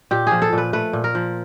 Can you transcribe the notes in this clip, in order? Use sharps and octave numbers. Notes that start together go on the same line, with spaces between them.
A#2 G4
F3 G#4
A4
A#2 B4
A3 B4
A#2
A#4
F3